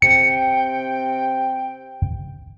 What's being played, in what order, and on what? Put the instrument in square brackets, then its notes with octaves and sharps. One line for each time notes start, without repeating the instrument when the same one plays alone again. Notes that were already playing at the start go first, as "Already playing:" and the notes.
[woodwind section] C3 C4 G5 [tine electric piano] C#7